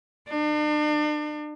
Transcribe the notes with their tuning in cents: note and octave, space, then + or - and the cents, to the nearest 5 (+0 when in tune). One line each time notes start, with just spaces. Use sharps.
D4 +40